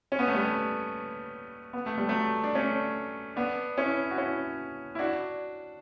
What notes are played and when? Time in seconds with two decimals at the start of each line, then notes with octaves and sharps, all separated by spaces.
0.12 C#4
0.19 B3
0.28 A3
0.35 G3 B3
1.73 B3
1.86 A3
1.98 G3
2.08 F#3 A3
2.44 D4
2.55 A3 C#4
3.36 B3 D4
3.77 C#4 E4
4.11 F#4
4.18 C#4 E4
4.95 E4
4.99 D4 F#4